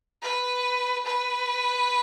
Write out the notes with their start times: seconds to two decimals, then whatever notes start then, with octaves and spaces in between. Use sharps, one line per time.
0.22 B4
1.05 B4